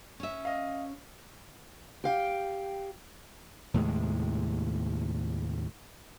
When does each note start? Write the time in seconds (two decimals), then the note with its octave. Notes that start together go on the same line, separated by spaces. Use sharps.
0.20 C#4 E5
0.45 D#5 F5
2.04 G4 F5 G5
3.74 D#2 A2 C3 G#3